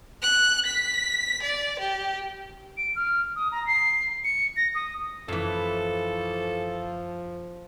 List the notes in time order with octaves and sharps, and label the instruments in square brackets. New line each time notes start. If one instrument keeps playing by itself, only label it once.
[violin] F#6
B6
D5
G4
[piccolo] D7
F6
D#6
A#5
C7
C#7
A#6
D#6
[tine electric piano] F#2 [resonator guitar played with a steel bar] A2 E3 [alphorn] F3 [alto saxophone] A4